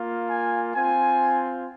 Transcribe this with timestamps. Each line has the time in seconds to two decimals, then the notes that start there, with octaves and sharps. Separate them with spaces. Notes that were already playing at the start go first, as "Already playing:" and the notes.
Already playing: A#3 F4
0.30 G#5
0.75 C4 F4 G#5